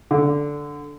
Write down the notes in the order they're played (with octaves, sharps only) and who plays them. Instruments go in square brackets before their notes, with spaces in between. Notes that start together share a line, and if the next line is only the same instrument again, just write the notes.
[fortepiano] D3